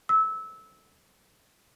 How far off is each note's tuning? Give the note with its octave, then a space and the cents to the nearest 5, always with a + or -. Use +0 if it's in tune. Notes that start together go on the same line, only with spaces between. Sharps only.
E6 -20